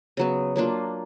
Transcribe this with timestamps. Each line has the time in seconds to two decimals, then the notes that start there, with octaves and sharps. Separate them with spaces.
0.17 C#3 F#3 B3
0.56 F#3 A#3 D4 F4